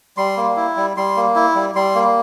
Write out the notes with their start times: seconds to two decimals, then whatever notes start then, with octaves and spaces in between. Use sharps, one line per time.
0.17 G3 C6
0.37 A#3
0.57 E4
0.77 G3
0.97 G3 C6
1.17 A#3
1.36 E4
1.55 G3
1.75 G3 C6
1.95 A#3